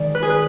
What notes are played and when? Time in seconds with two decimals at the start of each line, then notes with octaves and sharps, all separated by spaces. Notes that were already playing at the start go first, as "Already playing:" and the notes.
Already playing: D#3 G#3 D5
0.15 B4
0.23 G#4
0.30 B4